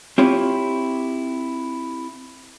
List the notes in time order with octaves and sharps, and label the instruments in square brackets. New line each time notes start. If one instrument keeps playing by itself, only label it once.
[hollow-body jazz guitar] C4 E4 F4 G4 C#5